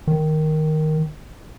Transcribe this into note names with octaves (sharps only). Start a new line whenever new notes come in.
D#3